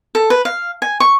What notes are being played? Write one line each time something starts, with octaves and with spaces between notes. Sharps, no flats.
A4
B4
F5
G#5
C#6